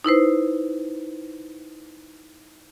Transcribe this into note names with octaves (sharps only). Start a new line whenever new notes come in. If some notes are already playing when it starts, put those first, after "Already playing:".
D#4 E4 B4 C5